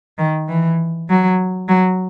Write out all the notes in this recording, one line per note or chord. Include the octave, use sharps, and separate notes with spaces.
D#3
E3
F#3
F#3